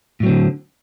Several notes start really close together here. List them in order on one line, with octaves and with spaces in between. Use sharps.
A2 F#3 C4 D3